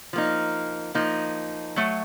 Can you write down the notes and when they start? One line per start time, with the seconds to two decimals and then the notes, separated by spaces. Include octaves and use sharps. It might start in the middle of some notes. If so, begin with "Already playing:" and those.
0.13 F3 A#3 D#4
0.95 F3 A#3 D#4
1.76 F#3 A3